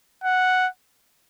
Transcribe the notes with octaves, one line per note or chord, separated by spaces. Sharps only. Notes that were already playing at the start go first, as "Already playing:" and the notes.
F#5